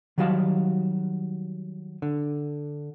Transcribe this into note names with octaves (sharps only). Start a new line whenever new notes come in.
D#3 F#3 G3 F#4 F5 A5
D3